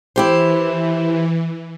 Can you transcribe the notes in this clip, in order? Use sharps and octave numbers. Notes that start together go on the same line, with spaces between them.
E3 E4 G4 C5